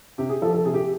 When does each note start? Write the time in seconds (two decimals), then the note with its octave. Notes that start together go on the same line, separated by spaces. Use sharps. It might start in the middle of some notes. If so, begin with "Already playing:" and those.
0.18 C3 G4
0.29 G#4
0.42 F3 A4
0.53 A4
0.65 C3 G#4
0.74 G4